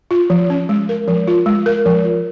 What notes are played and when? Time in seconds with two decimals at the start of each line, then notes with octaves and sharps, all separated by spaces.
0.11 F4
0.30 F3
0.50 C#4
0.69 G#3
0.89 A#4
1.08 F3
1.28 F4
1.46 G#3
1.66 A#4
1.86 F3
2.05 F4